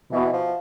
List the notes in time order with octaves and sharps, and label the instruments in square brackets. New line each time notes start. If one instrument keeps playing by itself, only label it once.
[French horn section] B2 [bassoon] E3
[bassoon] F3